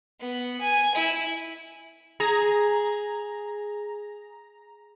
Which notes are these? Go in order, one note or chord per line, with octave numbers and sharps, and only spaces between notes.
B3
G#5
E4
G#4 A#5